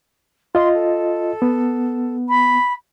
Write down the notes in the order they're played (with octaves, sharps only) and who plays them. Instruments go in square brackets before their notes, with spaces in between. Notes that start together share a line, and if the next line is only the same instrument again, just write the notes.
[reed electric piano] F4 D#5 [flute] C6
[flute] A4
[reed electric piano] B3
[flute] B5